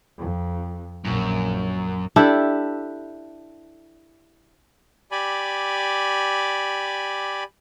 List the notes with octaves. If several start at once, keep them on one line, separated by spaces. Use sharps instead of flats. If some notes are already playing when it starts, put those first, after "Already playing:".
F2
A#1 F#2
D4 E4 G4 A4
G4 D5 G#5 B5